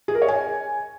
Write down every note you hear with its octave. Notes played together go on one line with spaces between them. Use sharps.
G#4
A#4
C#5
G#5